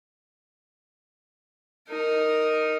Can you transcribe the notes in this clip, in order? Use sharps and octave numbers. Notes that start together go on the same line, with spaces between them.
D#4 A#4